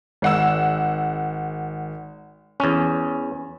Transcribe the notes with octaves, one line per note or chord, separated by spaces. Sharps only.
G#1 F#5 E6
E2 C#4